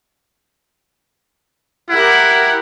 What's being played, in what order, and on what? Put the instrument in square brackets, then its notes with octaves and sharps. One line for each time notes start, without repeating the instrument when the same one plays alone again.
[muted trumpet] E4 [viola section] G4 A#4 F#5